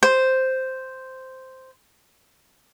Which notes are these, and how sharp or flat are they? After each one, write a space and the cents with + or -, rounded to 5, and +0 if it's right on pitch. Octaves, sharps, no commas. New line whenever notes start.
C5 -5